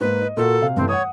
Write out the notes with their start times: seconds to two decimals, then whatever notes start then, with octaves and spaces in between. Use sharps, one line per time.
0.01 G#2 A#3 B4
0.22 D#5
0.37 A#2 A#3 F#4 A4
0.61 C3 F5
0.77 G2 E3 A3 C4
0.89 C#5 F#5 D#6